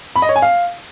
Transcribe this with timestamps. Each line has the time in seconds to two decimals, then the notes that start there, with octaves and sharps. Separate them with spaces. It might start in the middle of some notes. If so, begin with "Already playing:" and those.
0.16 B5
0.22 D#5
0.29 C#5
0.36 G#5
0.42 F5